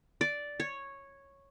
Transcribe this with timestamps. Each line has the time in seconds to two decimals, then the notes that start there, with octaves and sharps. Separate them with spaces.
0.21 D5
0.60 C#5